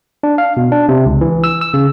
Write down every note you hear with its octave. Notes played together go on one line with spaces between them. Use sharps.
D4
F5
B2
D4
C3
C#2
E3
E6
E6
C#3